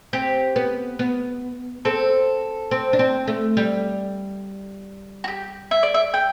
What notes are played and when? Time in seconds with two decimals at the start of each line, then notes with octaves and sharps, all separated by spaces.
0.13 C4 G4
0.56 B3
0.99 B3
1.85 C4 A4
2.71 C4
2.93 D4
2.99 C4
3.28 A3
3.57 G3
5.24 F#4
5.28 G4
5.71 E5
5.83 D5
5.94 E5
6.14 G5